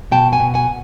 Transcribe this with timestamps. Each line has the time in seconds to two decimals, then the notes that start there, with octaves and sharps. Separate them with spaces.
0.11 B2 G5 A5
0.32 F#5 G#5
0.40 B2
0.54 F#5 G#5